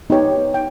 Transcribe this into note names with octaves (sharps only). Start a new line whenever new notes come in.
B3 D#4 G4 C#5 G5
G5